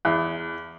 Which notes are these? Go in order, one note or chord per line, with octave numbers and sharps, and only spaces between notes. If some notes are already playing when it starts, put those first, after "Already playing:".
E2